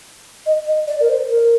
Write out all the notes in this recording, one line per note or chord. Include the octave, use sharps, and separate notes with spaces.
D#5
D#5
D5
A#4
C5
A#4